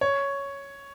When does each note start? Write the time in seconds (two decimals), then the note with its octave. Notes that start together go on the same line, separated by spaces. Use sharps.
0.01 C#5